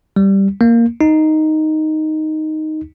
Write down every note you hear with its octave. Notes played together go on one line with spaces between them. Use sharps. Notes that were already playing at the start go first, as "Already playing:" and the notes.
G3
A#3
D#4